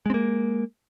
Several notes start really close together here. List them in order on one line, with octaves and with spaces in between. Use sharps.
G#3 C4 A#3